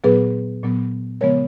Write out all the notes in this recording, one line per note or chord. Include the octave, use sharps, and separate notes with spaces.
A#2 F#3 B3 G#4 B4
A#2 F#3 B3
C#3 F3 G#3 B3 A#4 C#5